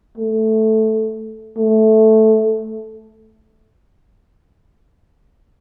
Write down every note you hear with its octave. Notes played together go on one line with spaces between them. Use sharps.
A3
A3